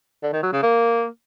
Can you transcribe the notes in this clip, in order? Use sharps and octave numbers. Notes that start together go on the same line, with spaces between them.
D3
D#3
F#3
C#3
A#3